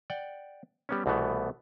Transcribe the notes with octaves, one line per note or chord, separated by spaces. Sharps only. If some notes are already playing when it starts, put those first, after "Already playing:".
D5 F#5 G5
G3 B3 C#4
C2 B2 E3 A3 B3